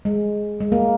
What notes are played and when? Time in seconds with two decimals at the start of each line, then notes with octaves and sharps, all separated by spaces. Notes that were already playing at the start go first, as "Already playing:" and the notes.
0.05 G#3
0.60 G#3
0.72 A#3